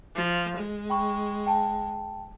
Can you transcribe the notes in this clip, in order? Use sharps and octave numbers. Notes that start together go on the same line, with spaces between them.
F3
G#3
G5 B5 C#6
G5 A5